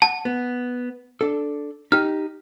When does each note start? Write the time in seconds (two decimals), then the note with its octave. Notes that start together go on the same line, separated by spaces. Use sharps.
0.02 F#5 A5
0.25 B3
1.21 D4 A4
1.92 D#4 G4 F6